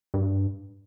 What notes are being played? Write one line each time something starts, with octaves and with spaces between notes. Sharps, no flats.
G2